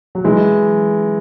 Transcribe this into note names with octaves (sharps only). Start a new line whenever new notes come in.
F#3
E3 G#3